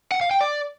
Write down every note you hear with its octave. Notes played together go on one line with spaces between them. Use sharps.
F#5
F5
G5
D5